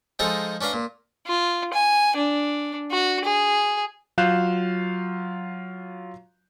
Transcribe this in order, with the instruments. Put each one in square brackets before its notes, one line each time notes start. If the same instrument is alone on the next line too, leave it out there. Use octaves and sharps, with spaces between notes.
[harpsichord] F3 G#3 D#4 G#4 A4 D#5
C#4 D4 B4 F5 A#5
A#2
[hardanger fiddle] F4
G#5
D4
F#4
G#4
[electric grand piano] F#3 F4 F5 F#6 G6 E7